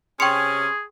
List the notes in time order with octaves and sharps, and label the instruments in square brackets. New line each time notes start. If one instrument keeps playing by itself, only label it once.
[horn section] C3 C#4 [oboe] G#4 [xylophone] G5 C#7 [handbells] C6 C#6